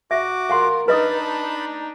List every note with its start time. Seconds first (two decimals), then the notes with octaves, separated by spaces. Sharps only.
0.11 F#4 E5 D6
0.50 F4 A#4 F5 F#5 C6
0.88 D4 D#4 B4 D#5 A5 B5 D#6